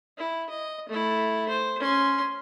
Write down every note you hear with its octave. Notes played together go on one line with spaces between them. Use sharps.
E4
D#5
A3 E4
C5
C#4 C6